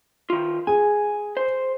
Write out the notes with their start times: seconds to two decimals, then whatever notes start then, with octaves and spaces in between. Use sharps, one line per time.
0.30 D#3 F4
0.67 G#4 G#5
1.37 C5